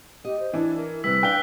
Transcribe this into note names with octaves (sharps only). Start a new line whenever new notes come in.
G4 D#5
C5
E3 D4
A#4
C3 G3 B4 E6 B6
D4 D5 F5 G5 F#6 G7